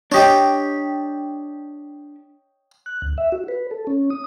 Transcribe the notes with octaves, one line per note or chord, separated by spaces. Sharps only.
D4 G4 C#5 D#5 G5
F#6
D2
E5
F#4
B4
A4
C#4
D#6